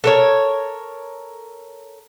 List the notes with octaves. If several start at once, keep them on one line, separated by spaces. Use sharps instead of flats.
A4 A#4 C#5